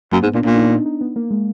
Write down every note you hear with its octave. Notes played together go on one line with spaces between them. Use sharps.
F#2 A#3
G#2 B3
A#2 D4
A#2 D4
D#4
D#4
D#4
B3
A#3
G#3